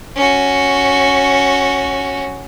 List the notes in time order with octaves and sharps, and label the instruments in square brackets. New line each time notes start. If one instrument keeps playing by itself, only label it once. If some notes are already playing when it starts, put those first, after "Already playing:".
[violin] C#4 F#4